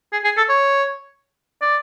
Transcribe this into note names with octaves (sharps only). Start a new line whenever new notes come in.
G#4
G#4
A4
C#5
D5